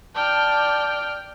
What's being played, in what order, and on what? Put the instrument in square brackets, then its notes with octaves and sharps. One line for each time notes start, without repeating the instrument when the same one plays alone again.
[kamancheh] D5 [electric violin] G5 F6 [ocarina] A5